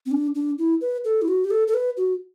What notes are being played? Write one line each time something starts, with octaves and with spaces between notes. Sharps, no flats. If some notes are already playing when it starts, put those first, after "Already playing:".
C4
D4
D4
E4
B4
A4
E4
F#4
G4
A4
A4
B4
F#4